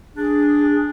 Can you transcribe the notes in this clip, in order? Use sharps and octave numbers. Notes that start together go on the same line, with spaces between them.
D4 G#4